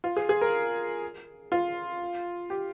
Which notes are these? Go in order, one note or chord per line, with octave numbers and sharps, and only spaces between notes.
F4
G#4
G#4
A#4
F4
G4